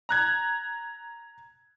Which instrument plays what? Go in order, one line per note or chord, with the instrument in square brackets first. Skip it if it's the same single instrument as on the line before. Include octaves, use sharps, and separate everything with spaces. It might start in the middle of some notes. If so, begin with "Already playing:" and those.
[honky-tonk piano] A#5 F#6 G#6